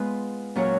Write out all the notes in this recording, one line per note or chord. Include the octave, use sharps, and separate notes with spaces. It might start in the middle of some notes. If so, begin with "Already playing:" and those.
Already playing: G#3 B3 F4 B4
A#2 F#3 C#4 F#4 C#5